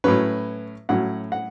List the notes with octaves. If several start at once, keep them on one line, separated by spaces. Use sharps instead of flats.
A2 F#3 C#4 B4
A2 F#3 C#4 F#5
F#5